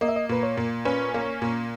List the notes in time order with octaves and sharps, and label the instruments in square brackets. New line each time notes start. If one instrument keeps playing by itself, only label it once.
[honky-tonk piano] A#3 [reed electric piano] D#5
[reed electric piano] E5
D#5
[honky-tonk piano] A#2 [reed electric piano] B4
[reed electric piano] C#5
[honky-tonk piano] A#2
[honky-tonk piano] C#4 [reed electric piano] B4
[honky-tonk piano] A#3
A#2